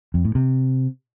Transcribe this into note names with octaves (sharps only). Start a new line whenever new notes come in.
F2
A2
C3